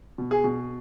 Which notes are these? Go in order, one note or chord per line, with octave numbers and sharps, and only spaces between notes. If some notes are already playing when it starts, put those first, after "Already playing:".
B2
G#4
B2